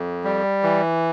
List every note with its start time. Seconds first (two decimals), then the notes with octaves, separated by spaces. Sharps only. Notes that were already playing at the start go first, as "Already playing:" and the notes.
Already playing: F2
0.24 G3
0.63 E3